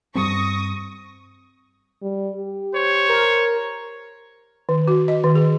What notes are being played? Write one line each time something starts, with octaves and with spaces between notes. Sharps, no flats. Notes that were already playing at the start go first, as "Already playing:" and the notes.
G2 G3 C4 C#6 D#6 A#6
G3
G4
C5 C#5
A#4
D#3
F#4
D#5
D#3
G#4